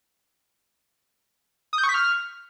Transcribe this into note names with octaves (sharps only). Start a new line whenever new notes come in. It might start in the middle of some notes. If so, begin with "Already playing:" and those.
D#6
G6
C#6
B6
F6